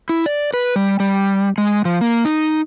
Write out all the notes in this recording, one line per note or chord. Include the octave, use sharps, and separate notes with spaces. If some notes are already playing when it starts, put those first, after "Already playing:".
E4
D5
B4
G3
G3
G#3
F3
A#3
D#4